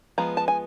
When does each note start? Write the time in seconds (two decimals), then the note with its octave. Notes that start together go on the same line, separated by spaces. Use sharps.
0.18 F3 G#3 B3 A#5
0.37 A5
0.48 G#5